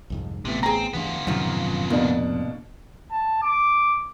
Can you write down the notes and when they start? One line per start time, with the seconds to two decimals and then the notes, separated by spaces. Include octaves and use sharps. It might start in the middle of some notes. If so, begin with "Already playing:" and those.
0.10 C2 F2 G#2
0.45 A1 A2 C3 A3 B3
0.63 C4 G#4 A#5
0.93 D2 E3 B3 D4 F4
1.27 F#2 A2 C3 D#3 F3
1.90 F2 B2 A#3 D4
3.11 A5
3.42 D6